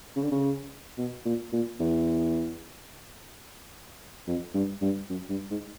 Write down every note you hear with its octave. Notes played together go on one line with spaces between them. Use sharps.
C#3
D3
C#3
B2
A#2
A#2
E2
F2
G2
G2
F#2
G2
G#2